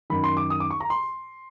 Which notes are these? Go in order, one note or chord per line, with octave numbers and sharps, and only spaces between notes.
F#2 D#3 B5
C6
D6
D#6
D6
C#6
A#5
C6